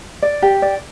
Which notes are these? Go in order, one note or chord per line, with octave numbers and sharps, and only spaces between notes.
D5
G4
D5